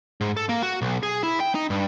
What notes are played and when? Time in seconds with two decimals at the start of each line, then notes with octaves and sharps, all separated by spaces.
0.21 G#2
0.37 A4
0.49 A#3
0.63 F#4
0.82 B1
1.03 G#4
1.23 E4
1.40 G5
1.55 D#4
1.70 G2